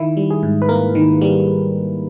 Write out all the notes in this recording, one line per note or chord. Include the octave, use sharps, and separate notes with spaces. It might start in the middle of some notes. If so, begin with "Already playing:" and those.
Already playing: D#3 E4
G3
G#4
G#2
B4
A#3 A#4
D#3
G3